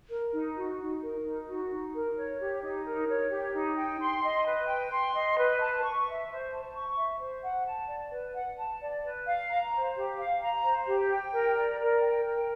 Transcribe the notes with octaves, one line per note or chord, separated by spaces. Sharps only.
A#4
D#4
F#4
D#4
A#4
D#4
F#4
D#4
A#4
C#5
G4
D#4
A#4
C#5
G4
D#4
G5
C6
D#5
B4
G5
C6
D#5
B4
A5
C#6
E5
C5
A5
C#6
E5
C5
F#5
A5
D5
B4
F#5
A5
D5
B4
F5
A#5
C5
G4
F5
A#5
C5
G4
G5
A#4
D5
A#4
G5
A#4